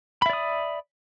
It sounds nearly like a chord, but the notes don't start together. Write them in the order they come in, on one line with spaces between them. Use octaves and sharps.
B5 E5 D5 D#6